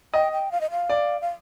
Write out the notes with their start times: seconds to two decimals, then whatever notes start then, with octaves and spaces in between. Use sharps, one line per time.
0.14 D#5 G5
0.32 G5
0.52 F5
0.61 D#5
0.71 F5
0.90 D5
1.21 F5